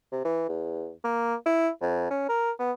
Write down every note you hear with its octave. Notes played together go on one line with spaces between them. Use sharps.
C3
E3
E2
A#3
E4
F2
C#4
A#4
B3